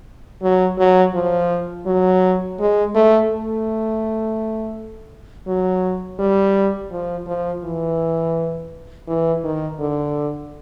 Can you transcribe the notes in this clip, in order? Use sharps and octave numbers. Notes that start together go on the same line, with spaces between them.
F#3
F#3
F3
F#3
G#3
A3
A3
F#3
G3
F3
F3
E3
E3
D#3
D3